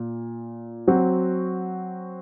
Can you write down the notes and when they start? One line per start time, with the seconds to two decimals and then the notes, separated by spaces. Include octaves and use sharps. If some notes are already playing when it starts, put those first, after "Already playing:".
Already playing: A#2
0.88 F#3 C4 F#4